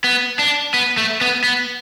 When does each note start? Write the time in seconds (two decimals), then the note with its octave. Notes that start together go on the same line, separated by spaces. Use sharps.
0.04 B3
0.39 D4
0.74 B3
0.97 A3
1.21 B3
1.44 B3